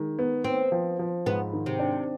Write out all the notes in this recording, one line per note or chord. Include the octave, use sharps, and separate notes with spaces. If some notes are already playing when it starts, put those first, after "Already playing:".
Already playing: D#3 G#3
B3
B3 C4
F3
F3
G#2 B3
D#3
C3
D4